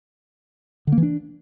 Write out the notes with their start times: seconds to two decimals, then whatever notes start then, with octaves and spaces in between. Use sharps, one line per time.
0.87 D3
0.92 A#3
0.98 E3
1.03 D4